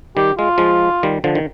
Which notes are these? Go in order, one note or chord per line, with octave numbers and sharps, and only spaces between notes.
D#3 G3 G4
G#3 F4
F3 G#3
D#3 G3
D3 F3
D#3